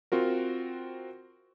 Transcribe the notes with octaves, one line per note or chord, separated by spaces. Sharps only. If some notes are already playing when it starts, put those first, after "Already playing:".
C4 F4 F#4 A#4